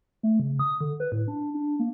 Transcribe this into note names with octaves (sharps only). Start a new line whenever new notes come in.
A3
C#3
D#6
D3
B4
A2
D4
D4
A#3